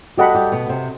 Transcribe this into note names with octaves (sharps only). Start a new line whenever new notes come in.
G3 F#4 G4 A4 D#5 F#5 B5
G3 G4
B2 B3
C3 C4